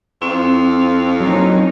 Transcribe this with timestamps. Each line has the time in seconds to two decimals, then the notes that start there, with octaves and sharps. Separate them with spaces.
0.22 F2 C4 E4
1.20 F#3 A#3 C#4 D#4